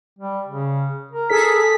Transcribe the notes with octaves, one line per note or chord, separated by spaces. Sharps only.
G3
C#3
A#4
G#4 A4 B6